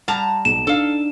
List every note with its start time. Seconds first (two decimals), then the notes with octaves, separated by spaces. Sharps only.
0.08 G3 F#5 A5 A#5
0.45 B1 E7
0.67 D4 D#4 A4 F5